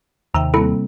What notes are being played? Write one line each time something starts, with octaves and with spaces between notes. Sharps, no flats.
D#2 C3 E5 G5 A#5
G3 A#3 C4 E4 A4